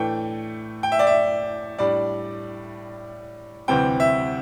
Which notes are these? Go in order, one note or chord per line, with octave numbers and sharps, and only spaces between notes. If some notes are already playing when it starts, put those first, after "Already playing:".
Already playing: A2 E3 A3 D4 G5
G5
E5
D5
E5
A2 G3 D4 D5
D2 C3 E3 G3 C4 G5
E5